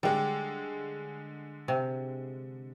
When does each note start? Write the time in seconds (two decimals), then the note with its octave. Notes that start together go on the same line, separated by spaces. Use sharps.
0.03 D3 G3 G#3
1.68 C3